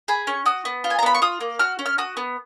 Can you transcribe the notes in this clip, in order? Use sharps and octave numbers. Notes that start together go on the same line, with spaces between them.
G#4 B5
C#4 C#6
F#4 D#6
B3
F4
G#5
A#5
B3 B5
C#6
F4 D#6
A#3
F#4 F6
C#4
F6
F#4 D#6
B3